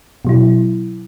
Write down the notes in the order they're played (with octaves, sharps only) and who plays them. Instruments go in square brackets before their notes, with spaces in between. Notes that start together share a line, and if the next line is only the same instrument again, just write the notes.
[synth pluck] B2 F#3 E4